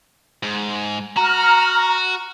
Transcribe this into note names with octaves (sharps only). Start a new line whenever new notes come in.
G#2
F#4 A#5 F6